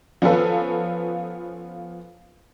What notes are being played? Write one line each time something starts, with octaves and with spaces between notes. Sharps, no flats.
F3 B3 C#4 F4 A4 B4